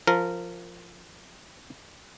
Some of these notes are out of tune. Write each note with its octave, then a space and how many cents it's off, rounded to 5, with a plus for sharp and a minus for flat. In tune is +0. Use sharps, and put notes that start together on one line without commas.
F3 +0 A#4 -15